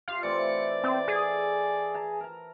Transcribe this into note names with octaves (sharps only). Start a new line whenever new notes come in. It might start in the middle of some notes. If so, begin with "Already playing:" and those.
F4 G4 F5
E3 A3 C4 D5 C#7
C4 A4
G#4
A5 A#5
A#4 A#5